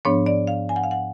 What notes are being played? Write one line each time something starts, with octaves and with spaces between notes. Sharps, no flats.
G#2 F3 B3 D4 C#5
D5
F5
G#5
F#5
F5
F#5